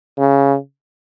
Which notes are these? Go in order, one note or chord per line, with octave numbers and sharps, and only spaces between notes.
C#3